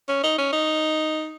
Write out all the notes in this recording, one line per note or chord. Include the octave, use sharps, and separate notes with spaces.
C#4
D#4
C#4
D#4